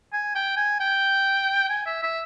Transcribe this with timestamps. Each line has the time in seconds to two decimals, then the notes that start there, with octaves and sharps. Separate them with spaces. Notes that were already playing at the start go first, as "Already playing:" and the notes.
0.13 G#5
0.35 G5
0.57 G#5
0.80 G5
1.69 G#5
1.86 E5
2.03 E5